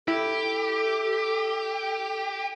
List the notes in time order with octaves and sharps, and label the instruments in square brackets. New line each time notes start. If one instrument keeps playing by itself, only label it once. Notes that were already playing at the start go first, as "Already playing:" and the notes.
[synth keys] E4 [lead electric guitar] G4 [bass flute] A4